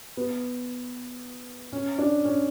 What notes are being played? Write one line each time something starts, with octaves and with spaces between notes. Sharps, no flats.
B3
C#4
D4
C#4